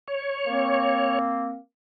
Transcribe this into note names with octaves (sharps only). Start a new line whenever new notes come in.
C#5
A#3 C4